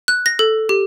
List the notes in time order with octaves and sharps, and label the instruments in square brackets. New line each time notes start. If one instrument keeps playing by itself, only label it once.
[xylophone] F#6
A#6
A4
G4